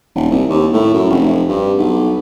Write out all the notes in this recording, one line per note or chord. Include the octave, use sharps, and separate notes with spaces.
D#1
C2
D#2
A2
F#2
F1
G2
B1